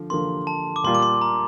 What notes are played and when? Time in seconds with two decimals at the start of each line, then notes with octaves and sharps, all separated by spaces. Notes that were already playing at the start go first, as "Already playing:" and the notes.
Already playing: D3 F3
0.10 D3 F3 A#3 C6
0.47 A5
0.76 D6
0.84 A#2 G3 A#3 F4 C6
0.95 D6
1.02 C6
1.21 A#5